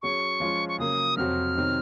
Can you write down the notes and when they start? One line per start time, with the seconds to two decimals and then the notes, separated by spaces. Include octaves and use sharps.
0.02 F#3 C#4 G#4 C#6
0.40 F3 G#3 C#4 F4
0.69 C#6
0.78 C#3 F#3 A#3 D#6
1.17 F2 C3 F#3 C4 F#4 F6
1.55 C3 D#3 F#3 C4